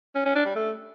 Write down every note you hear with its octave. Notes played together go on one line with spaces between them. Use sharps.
C#4
C#4
D4
G3
A3